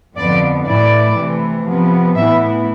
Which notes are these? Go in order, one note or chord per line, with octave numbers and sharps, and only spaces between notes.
F2 D3 F3 B3 D5
A2 E3 A3 E4 D5
C3 E3 A3
C3 F3 B3
A2 E3 B3 E4 E5